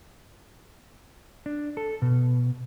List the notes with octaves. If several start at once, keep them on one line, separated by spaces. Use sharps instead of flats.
D4
A4
B2